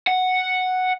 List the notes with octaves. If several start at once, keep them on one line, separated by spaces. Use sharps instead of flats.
F#5